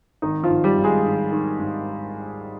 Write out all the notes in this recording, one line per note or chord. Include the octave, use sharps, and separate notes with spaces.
G#1 D#3 D#4
F3 F4
G#1
G3 G4
G#1
G#3 G#4
G#1
D#3
G#2